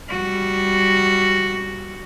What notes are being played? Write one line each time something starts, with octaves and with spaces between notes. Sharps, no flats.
G3 F#4